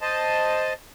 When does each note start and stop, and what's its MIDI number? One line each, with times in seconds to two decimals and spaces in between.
0.01 0.73 72
0.01 0.73 75
0.01 0.73 81